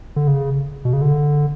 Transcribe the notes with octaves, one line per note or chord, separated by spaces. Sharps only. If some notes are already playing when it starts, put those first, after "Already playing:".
D3
C#3
B2
C#3
D3